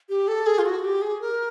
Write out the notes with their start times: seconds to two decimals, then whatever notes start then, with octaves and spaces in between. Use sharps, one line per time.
0.09 G4
0.28 A4
0.47 G#4
0.59 F4
0.66 F#4
0.84 G4
1.02 G#4
1.21 A#4